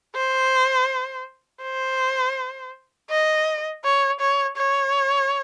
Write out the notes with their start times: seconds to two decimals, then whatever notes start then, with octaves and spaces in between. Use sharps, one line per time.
0.15 C5
1.62 C5
3.10 D#5
3.84 C#5
4.20 C#5
4.57 C#5